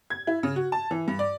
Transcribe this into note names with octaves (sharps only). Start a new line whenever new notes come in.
G#6
E4
C#3
F#4
A5
E3
G2
D5